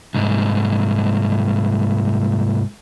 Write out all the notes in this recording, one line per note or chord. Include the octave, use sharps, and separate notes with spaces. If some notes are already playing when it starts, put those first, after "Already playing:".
C2 G#2